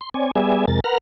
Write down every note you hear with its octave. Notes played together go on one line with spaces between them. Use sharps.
C6
C4 C#5 D5 G#5
G3 B3 G#4 D5 E5 G#5
F2 C3 G#3 A#4 A6
A#4 B4 F#5 A#5 F6